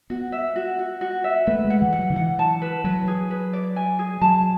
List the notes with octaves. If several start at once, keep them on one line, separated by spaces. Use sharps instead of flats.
B3 F#4
E5
F#4
F#4
F#4
E5
A3 B4
G#3
F#5
E3
F#5
F#3
D3
E3 F#5
A5
B4
F#3 B4
G#4
B4
D5
G#5
G#4
F#3 A5